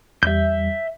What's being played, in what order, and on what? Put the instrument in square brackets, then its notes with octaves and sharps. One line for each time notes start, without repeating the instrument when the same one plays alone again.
[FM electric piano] E2 G3 [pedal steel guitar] E5 G6